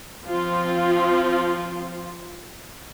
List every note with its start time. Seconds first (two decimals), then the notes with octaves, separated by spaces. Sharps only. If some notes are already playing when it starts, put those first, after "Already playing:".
0.25 F3 C4 F4